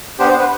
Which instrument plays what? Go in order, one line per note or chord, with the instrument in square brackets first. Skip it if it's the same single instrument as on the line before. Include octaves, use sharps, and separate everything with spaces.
[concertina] B3 D4 G4 C5
C5
B4